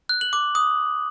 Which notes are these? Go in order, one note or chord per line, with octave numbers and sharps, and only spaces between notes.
F#6
F#7
D6
D#6